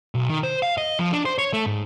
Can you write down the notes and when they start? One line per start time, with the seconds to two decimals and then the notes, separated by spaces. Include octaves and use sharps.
0.15 B1
0.28 D#3
0.44 C5
0.63 F5
0.78 D#5
0.99 F3
1.12 D4
1.25 C5
1.38 C#5
1.53 A3
1.66 G#2